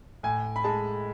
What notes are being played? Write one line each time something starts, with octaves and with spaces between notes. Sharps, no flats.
A2 G#5
B5
G#3 A5